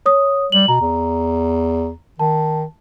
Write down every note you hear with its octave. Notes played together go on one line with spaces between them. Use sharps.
C#5 D#6
G3 F#7
B2 A#5
E2
D#3 A5